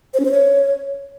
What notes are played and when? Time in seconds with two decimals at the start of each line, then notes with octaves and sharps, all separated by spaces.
0.14 C5
0.19 C#4
0.25 C5
0.31 C#5